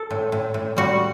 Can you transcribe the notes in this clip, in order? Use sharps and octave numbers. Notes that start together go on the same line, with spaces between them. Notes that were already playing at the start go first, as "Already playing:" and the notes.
Already playing: A4
A2
A2
A2
G3 F#4